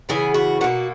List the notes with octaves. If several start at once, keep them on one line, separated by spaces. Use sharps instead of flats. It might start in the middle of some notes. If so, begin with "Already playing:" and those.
C#3 E3 B3 G#4
F#4
B2 A#3 F#4